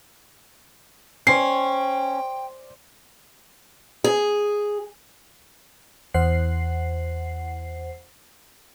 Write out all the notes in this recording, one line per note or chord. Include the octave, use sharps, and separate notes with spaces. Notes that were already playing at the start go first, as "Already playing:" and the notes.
C#4 C5 D5 G5 C7
G#4
E2 C5 F#5 C7